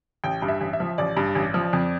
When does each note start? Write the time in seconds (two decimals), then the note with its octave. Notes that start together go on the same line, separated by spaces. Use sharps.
0.24 A1 G5
0.42 G2
0.48 E5
0.61 A1
0.73 E5
0.80 F3
0.98 A1 D5
1.17 G2
1.35 A1
1.54 F3
1.73 F2